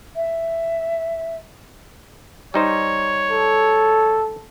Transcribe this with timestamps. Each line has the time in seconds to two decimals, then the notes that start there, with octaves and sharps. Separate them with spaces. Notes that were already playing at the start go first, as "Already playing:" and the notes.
0.16 E5
2.54 G3 D#4 C5 C#5
3.31 A4